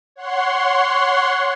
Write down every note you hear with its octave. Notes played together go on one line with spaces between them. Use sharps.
C#5 F#5 C6